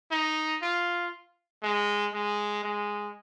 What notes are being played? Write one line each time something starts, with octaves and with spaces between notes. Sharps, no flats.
D#4
F4
G#3
G#3
G#3